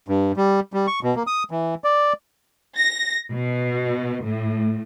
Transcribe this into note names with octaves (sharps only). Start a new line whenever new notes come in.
G2
G3
G3
C#6
B2
A#3
D#6
E3
D5
A#6
B2
A2